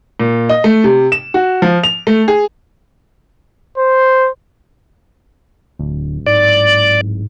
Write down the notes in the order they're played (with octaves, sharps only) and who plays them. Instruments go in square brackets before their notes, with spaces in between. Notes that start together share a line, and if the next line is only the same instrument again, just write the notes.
[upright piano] A#2
D#5
A3
C3
E7
F#4
F3
F7
A3
G#4
[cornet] C5
[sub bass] D1 [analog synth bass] D2
[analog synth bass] G#2 [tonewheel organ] D5